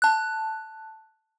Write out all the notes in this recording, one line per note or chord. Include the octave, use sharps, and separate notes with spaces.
A5 F#6